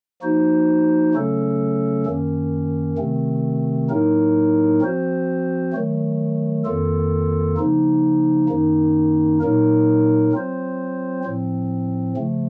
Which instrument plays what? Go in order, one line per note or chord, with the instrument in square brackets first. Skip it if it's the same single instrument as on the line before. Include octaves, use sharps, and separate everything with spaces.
[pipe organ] F3 A#3 D#4 F#4 C5
C#3 F#3 A3 C#4 A4
F#2 D#3 A#3 C#4
C3 D#3 A3 C4
A2 F#3 A#3 D#4 A#4
F3 C4 F#4 C5
D#3 F#3 A3
F2 D#3 A#3 F4 A4
C#3 F3 A#3 D#4
F#2 D#3 A#3 D#4
A#2 F#3 A#3 D#4 A#4
F#3 C4 F4 C5
A2 F3 C4
C#3 F3 A3